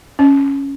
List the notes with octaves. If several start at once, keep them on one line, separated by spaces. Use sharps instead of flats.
C#4